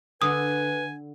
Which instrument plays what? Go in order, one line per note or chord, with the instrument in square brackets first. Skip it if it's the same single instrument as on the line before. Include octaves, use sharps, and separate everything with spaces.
[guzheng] D3 [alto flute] B4 [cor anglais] G#5 [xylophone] D#6